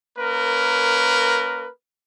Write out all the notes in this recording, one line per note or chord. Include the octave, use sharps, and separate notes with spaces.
A#3 C#4 A#4 B4